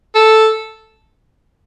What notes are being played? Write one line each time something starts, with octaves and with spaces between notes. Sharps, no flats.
A4